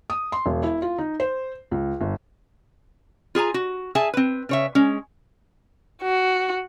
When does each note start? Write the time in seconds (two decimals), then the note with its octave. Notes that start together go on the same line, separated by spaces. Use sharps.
0.10 D#6
0.32 C6
0.46 E1
0.63 E4
0.82 F4
0.98 D#4
1.20 C5
1.71 C#2
2.01 G1
3.35 F4 G#4 G#5 A#5
3.54 F#4
3.95 G#4 E5 G#5 A5
4.14 C4 B4
4.49 C#3 C#5 E5
4.75 G#3 C#4
6.03 F#4